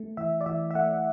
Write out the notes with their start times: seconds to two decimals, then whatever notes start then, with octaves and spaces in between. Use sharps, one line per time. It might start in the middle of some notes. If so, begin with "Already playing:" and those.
Already playing: A3
0.17 E3 E5
0.41 D5
0.46 E3 E5
0.71 E5
0.75 A3 F#5